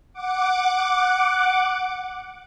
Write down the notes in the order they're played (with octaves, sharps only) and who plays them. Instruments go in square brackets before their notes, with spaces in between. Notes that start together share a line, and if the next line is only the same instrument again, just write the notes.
[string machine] F#5 D6